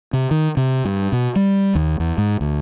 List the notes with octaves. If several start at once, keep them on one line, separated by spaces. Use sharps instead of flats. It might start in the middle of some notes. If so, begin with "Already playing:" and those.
C3
D#3
C3
G2
B2
G3
D#2
E2
G#2
D2